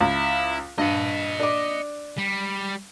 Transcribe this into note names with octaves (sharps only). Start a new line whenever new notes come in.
C#2 E4
G2 D#5 F#5
D4 D6
G3